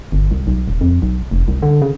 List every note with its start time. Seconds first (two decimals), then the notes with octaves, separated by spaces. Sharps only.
0.12 G1
0.31 C2
0.47 B1
0.68 D#1
0.81 F2
1.02 B1
1.31 F1
1.48 C2
1.62 D3
1.82 C#3